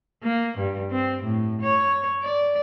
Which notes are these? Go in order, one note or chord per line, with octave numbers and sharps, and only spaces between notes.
A#3
G2
C4
A2
C#5
D5